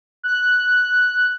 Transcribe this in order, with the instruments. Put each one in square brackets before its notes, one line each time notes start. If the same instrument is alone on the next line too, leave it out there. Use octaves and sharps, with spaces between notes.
[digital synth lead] F#6